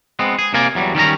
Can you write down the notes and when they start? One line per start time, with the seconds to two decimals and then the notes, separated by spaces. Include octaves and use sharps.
0.19 G#3 B3 C4
0.39 G#4
0.54 C3 A#3 A#4 D5 G#5
0.75 E2 F#3 G3
0.95 D#3 G3 C#4 A#5